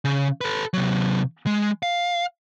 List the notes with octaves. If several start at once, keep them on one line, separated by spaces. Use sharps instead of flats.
C#3
A4 B4
C3 F#3
G#3
F5